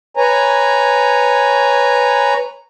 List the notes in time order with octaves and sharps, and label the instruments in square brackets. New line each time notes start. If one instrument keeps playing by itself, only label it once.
[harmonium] B4 C#5 G#5 A#5